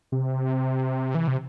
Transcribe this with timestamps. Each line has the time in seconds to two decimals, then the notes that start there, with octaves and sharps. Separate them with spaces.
0.12 C3
1.15 E3
1.28 C3